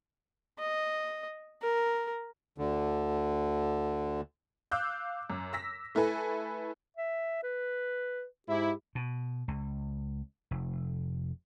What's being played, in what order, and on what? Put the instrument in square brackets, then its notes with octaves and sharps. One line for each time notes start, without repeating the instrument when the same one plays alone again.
[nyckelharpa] D#5
A#4
[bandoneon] D2 D3
[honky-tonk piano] F5 D6 E6 F#6 G6
F#2
E6 A#6 B6
A3 E4 A4 B4 G#5
[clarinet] E5
B4
[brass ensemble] G#2 E4 [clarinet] G4
[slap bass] B2
C#2
F1